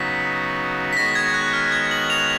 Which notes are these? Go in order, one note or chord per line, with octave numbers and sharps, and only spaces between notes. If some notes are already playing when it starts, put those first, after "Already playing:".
Already playing: C#3 F#3 B3 D#4 F#4 B6
B6
D#3 G#3 B3 F#4 C#5 A#6
G#6
F#6
F6
G#6
F#7
F7